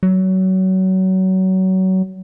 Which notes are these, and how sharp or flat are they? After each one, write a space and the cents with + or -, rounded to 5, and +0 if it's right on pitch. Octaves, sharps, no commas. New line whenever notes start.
F#3 +25